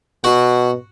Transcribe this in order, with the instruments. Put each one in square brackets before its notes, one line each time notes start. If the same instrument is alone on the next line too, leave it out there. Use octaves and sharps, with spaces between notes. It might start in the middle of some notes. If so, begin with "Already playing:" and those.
[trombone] B2 [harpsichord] F#4 F#5